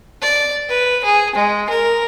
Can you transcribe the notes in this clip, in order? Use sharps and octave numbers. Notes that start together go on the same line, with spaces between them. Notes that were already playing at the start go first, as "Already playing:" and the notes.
D5
B4
G#4
G#3
A#4